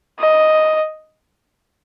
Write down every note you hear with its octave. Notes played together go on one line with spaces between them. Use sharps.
D#5